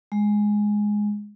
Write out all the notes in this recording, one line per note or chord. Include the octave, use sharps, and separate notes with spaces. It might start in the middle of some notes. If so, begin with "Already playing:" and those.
G#3